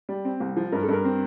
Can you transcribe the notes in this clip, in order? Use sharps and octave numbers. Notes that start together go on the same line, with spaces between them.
G3
C4
C2
F3
G2 A#4
A4
G2 A#4
C4